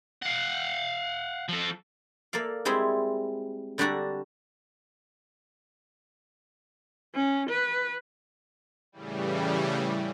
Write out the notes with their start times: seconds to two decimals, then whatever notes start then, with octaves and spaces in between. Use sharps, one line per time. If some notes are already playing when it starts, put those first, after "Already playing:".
0.22 F5 F#5
1.49 F3 A4
2.33 A#3 A4 D5 F5
2.65 G3 G#3 C4 E4 G#4
3.78 D3 G3 D4 F#4 D5 A#5
7.15 C#4
7.50 B4
8.92 A2 C#3 E3 G3